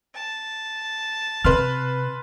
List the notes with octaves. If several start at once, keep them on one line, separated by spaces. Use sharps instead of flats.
A5
C3 B4 C6 F6